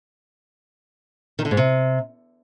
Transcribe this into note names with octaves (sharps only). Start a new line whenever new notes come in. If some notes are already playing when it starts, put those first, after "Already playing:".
D#3
D3
G#2
C3